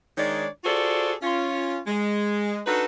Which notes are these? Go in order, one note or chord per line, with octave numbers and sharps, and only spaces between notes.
D#3 G#3 D4 D#4 C#5 D5
F4 F#4 G#4 A4 C5 D5
C#4 F4
G#3
D4 D#4 F#4 A4 B4